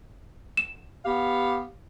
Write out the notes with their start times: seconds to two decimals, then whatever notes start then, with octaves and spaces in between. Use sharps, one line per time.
0.57 E7
1.05 B3 G4 F5